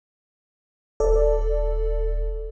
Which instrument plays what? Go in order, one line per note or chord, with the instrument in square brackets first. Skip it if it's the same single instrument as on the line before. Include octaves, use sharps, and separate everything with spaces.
[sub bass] D#1 [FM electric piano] A4 D5